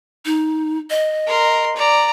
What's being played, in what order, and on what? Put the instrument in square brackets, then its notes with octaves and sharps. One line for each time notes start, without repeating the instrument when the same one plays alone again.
[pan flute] D#4
D#5
[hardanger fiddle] A#4 C6
D5 A#5